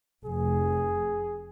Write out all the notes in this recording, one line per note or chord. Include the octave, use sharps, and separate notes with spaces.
F1 G#4